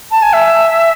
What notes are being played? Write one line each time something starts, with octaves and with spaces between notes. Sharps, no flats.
A5
G#5
E5